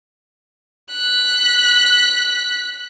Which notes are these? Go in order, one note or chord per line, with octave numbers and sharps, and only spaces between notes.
F#6 B6